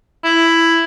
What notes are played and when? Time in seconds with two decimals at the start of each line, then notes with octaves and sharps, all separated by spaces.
0.24 E4